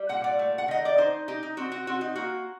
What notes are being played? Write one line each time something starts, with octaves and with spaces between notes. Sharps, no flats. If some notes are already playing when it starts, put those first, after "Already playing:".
Already playing: G3
A#2 F#5
D5
A3
F#5
D#3 D#5
D5
D#4 C5
D#4 G4
D#4
C4 F#4
F#4
C4 F#4
D#4
A#3 F#4